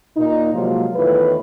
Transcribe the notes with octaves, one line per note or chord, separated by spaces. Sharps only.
A#2 D#4
C3 F3 F#3 G#3 A#3 F4
E2 A2 D#3 F4 B4